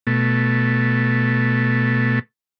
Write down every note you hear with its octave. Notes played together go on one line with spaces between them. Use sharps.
B2 A3